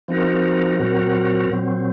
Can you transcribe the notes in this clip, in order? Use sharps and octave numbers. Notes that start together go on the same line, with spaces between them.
F3 C4 D#4 F#4 A#4
A#2 F#3 C4 F#4 A#4
A#2 F#3 C4